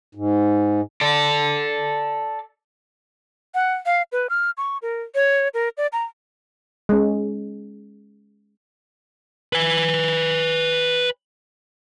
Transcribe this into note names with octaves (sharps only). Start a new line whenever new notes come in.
G#2
A4 D5
F#5
F5
B4
F6
C#6
A#4
C#5
A#4
D5
A#5
G#3 C#4
B4 G#5